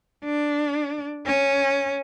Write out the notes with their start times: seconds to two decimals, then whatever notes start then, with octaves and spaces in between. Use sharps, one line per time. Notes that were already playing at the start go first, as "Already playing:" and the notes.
0.24 D4
1.26 C#4